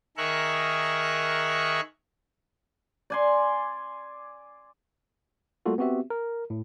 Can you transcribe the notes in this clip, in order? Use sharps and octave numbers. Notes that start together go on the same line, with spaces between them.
D#3 G#4 A#4 E5 C#6 F#6
D5 G#5 C6
G3 A3 A#3 F4 F#4 A4
B3 C4 F#4 G4 E5
A#4
A2